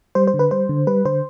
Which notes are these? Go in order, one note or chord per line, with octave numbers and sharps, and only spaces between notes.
G3 C5
C5
D3
B4
G3 C5
D3
G3 B4
D3 C5